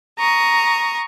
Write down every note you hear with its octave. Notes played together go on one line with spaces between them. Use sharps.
A#5 C#6 D#6